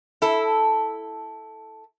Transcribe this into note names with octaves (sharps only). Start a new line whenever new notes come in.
E4 A4